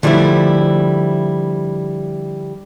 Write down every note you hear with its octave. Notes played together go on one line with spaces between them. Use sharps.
D3 F3 G3 A3 E4